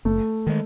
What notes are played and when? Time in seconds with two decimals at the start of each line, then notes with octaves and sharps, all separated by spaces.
0.05 F#1 A3
0.47 D#3 G#3